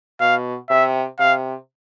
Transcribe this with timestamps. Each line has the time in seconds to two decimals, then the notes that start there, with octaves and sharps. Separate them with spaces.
0.20 B2 F5
0.70 C3 E5
1.19 C3 F5